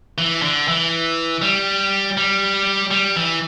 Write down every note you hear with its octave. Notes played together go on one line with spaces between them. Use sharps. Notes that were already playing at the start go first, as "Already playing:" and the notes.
E3
D3
E3
G3
G3
G3
E3